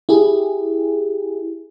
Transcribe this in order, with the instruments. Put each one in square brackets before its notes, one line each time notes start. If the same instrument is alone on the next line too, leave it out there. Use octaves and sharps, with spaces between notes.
[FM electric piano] E4 G4 G#4